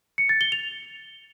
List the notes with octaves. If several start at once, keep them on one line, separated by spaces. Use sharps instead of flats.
C#7
A6
G7
F7